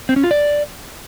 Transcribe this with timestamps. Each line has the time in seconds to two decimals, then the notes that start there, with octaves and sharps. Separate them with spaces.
0.09 C4
0.16 C#4
0.24 F4
0.31 D5